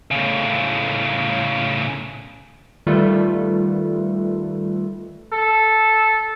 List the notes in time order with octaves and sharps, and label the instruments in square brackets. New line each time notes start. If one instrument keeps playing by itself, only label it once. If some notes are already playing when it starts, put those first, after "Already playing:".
[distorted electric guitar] A2 C#3
[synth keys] D#3 G3 A3 F4 A4 B4
[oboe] A4